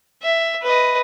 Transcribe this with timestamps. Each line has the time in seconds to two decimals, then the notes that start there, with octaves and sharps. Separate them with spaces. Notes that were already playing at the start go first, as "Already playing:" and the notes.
0.22 E5
0.62 B4 D#5